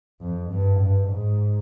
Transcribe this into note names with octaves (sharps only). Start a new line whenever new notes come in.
F2
G2
G2
G#2